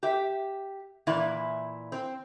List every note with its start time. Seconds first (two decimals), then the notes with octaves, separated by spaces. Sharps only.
0.03 G4 E5
1.07 A#2 E3 E4
1.92 C4